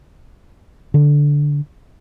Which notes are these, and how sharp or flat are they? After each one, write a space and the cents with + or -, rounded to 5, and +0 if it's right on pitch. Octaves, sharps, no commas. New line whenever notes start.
D3 -5